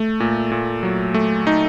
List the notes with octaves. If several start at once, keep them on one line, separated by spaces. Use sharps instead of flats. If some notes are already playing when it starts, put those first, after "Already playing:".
Already playing: A3
A#2
A#2
F#3
A3
D#4